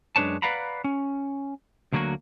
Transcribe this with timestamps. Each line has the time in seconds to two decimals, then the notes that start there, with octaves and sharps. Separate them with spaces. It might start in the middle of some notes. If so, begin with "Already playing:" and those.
0.16 F#2 G#3 D4 B4 C#5 A5
0.42 B4 D5 F5 F#5 A#5 B5
0.84 C#4
1.93 D2 D3 F#3 G#3 A#3 F#4